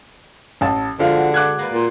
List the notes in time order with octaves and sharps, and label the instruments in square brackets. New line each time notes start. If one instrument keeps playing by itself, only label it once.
[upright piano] A1 A5
[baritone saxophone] D3 [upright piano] F3 F5 [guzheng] G#3 F#4
[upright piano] D6 F#6 G#6
[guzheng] A#3 B4 D5
[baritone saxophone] A#2